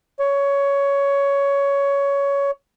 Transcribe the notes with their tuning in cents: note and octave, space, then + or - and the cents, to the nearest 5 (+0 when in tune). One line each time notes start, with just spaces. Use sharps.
C#5 +15